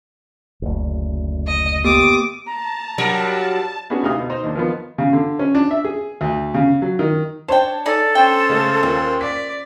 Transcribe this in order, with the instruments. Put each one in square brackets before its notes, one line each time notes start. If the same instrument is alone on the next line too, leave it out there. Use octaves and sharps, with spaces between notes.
[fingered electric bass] F#1 D2
[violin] D#5
[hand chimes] A#3 B3 G4 [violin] D6 D#6
[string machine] A5 [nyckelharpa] A#5
[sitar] G2 G3 A#4 [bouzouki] F#3
[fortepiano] B3 C#4 D4 F#4 G#4
D2 C3 D#4 D#5 F5 D#6
B2 D#4
D#4 C5
D#2 D4
D#3 F3 B3
C#3
D3
C#4
D4
E5
G#4
D2
C#3
F#3
D#3
[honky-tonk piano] D4 C#5 A5 [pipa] C5 G5
[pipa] G#3 D#4 D5 [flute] A4
[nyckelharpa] C#4 C5 [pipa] G5
[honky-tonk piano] C#3 G#3 A3
[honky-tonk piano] D#2 [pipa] F4
[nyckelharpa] D5 [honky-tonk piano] B6